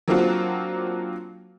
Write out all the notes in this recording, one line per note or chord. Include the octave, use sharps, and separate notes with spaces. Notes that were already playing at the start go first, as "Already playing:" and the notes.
F#3 A#3 C4 D4 F4 F#4